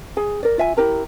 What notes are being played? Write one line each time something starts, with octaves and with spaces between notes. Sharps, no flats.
G#4 G#5
A#4 D5
F4 E5 G#5
E4 G4 A#4 A#5